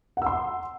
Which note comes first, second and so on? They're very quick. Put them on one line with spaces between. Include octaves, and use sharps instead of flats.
F#5 E6 C6